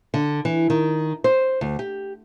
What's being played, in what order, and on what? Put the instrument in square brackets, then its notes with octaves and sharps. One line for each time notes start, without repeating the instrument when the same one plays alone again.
[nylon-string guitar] D3
E3
D#3
C5
D2
G4